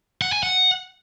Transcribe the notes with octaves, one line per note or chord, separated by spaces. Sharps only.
F#5
G#5
F#5